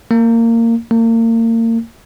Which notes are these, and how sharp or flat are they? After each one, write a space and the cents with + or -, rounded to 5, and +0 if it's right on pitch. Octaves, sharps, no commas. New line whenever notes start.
A#3 -20
A#3 -35